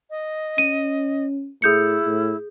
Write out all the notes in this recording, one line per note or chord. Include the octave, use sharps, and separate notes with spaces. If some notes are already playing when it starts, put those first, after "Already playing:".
D#5
C#4 D#7
A2 E4 G#4 G6 C#7
A2